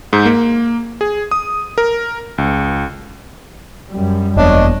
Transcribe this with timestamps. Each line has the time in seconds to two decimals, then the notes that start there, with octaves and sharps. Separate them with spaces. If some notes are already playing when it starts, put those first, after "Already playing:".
0.13 G#2
0.25 A#3
1.01 G#4
1.31 D#6
1.78 A#4
2.38 C#2
3.92 F#2 G3
4.36 E1 A#3 B3 D4 C#5 D#5